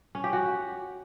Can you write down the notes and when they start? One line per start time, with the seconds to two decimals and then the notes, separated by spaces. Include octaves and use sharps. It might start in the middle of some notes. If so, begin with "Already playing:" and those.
0.15 C#4
0.24 G4
0.33 F#4